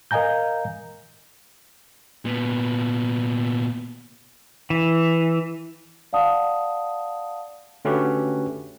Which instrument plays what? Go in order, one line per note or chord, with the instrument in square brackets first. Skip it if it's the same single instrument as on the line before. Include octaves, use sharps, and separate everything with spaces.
[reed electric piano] A#4 D#5 F5 G#5 A#5 G6
[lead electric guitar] A#2 B3
[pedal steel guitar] E3
[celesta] D5 F5 F#5 A5 D#6
[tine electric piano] D3 A3 C#4 F#4 G4 B4